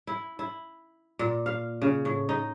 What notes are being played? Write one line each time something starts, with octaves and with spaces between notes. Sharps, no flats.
E4
E4
A#2
F5
C#3
A2
D#4